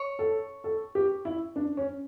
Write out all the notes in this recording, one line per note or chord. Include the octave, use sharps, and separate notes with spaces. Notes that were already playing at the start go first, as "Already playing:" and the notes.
Already playing: C#5
A4
A4
G4
E4
D4
C#4